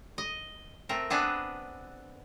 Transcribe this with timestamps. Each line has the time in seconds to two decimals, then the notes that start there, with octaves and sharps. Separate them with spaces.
0.18 D#5
0.89 A3 C4 A#4
1.10 B3 C4 D4 G#4 B4